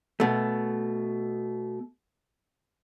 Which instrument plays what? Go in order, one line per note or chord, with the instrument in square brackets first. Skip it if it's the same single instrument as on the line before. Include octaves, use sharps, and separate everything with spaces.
[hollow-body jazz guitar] B2 A3